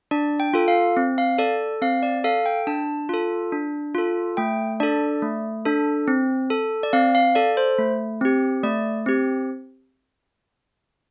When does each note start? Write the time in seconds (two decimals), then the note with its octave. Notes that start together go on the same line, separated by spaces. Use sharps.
0.11 D4 D5
0.40 G5
0.54 F4 A4
0.68 F5
0.97 C4
1.18 F5
1.38 A4 D5
1.82 C4 F5
2.03 D5
2.24 A4 F5
2.46 G5
2.67 D4 A5
3.09 F4 A4
3.52 D4
3.95 F4 A4
4.37 A3 G5
4.80 D4 A4 D5
5.22 A3
5.66 D4 A4
6.08 C4
6.50 A4
6.83 D5
6.93 C4 F5
7.15 F5
7.35 A4 D5
7.57 C5
7.78 A3
8.21 C4 G4
8.63 A3 D5
9.06 C4 G4